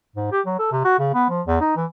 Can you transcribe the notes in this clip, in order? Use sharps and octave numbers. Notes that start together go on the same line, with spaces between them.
G#2
G4
F#3
A4
C3
F#4
C#3
B3
F3
E2
D#4
E3